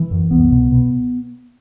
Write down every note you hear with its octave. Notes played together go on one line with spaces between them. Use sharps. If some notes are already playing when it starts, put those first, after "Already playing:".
Already playing: E3
F#2
C2 B3
B2
B2